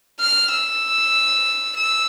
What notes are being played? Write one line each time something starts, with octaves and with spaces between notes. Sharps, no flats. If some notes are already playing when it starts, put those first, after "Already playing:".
F6
E6
E6